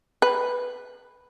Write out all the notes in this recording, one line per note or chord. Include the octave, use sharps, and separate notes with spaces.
B4